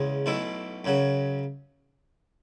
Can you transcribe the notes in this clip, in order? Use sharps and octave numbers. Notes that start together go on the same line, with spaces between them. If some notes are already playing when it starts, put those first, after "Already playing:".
Already playing: E2 C#3 G#3 C#4
B1 B2 A3 E4
F#2 C#3 F#3